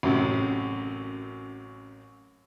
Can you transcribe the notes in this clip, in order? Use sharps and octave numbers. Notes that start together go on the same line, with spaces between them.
A1 F#2 C3